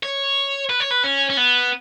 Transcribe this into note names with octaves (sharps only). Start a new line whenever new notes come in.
C#5
B4
C#5
B4
C#4
C#4
B3